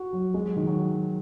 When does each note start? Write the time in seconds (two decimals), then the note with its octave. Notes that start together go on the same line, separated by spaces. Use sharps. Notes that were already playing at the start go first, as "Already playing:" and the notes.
Already playing: F#4
0.13 F#3
0.34 G#3
0.46 F#3
0.56 D#3
0.67 F#3